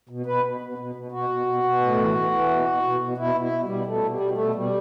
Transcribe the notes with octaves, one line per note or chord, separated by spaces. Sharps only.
B2
B2 B4
B2
B2
B2
B2
B2 F#4
B2
B2
B2
A2
E3
E3
E3
B2
B2
B2
B2
B2 E4
B2
E4
B2
G3
B2
B2 A3
B2
G3
B2
A3
B2
B2 G3